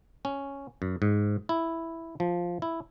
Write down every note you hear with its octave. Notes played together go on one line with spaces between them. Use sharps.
C#4
F#2
G#2
E4
F3
E4